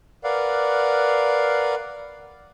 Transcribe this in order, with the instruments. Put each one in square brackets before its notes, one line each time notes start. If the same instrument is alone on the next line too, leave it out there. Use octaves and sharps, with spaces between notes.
[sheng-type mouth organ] A#4 B4 D5 F5 F#5